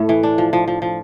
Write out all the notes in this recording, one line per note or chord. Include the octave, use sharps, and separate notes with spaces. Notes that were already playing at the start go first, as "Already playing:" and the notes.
Already playing: A2 A3
E3
D4
F3
F3
F3
F3